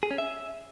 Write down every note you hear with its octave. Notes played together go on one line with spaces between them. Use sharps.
G#4
C#4
E5